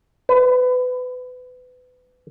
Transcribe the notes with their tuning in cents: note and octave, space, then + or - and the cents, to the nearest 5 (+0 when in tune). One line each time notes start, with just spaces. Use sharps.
B4 +25